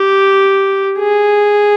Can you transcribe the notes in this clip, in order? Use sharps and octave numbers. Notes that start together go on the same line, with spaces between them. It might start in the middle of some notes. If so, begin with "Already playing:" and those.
Already playing: G4
G#4